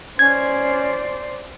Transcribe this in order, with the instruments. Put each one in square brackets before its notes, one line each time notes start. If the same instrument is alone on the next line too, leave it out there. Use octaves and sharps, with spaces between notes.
[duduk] C#4 [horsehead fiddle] C5 D5 [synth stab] G#6